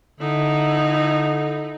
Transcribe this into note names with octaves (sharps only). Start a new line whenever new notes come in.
D3 D#4 E4